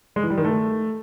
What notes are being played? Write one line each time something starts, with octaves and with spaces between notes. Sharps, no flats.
G#3
E3
G3
D#3
A3